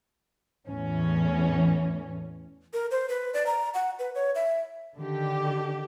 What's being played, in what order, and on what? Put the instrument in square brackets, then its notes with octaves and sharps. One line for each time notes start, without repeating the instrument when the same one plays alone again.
[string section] E2 A2 E3 C#4
[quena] A#4
C5
B4
D5
A#5
F#5
B4
C#5
E5
[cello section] D3 D#3 G4